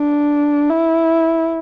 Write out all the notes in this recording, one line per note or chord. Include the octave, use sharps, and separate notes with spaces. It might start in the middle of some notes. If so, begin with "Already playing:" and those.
Already playing: D4
E4